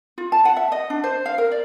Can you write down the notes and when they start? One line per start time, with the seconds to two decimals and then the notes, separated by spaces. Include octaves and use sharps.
0.18 F4
0.32 A5
0.45 F#5
0.57 E5
0.72 D#5
0.90 D4
1.04 C5
1.26 F5
1.38 A#4
1.51 D5